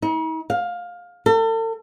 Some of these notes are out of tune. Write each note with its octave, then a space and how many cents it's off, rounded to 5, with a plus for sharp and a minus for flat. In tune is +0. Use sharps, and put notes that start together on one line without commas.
D#4 +45
F5 +15
A4 +40